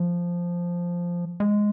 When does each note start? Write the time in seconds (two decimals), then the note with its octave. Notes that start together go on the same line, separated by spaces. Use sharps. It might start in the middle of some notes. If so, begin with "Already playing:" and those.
Already playing: F3
1.40 G#3